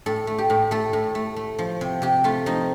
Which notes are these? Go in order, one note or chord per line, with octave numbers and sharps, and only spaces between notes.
A2 A4
A3
G4
A2
A3 A4
A2
A3
A3
F3
C3
C3 G4
A3 F4
F3 D#4